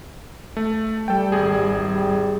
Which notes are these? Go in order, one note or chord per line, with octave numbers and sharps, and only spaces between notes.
A3
G3 A4 G5
G#1 G#4
G3